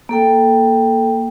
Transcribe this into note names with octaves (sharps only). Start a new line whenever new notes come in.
A#3 A4 G5